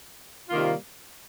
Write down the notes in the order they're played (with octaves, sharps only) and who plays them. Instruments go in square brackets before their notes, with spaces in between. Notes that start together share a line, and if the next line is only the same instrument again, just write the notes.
[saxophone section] C3 D#3 G3 A#3 F4